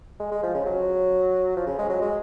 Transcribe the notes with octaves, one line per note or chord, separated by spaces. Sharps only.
G#3
G#3
F3
C#3
F#3
F3
C#3
G#3
F#3
G#3